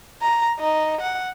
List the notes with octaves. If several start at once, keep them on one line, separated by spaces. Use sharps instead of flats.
A#5
D#4
F#5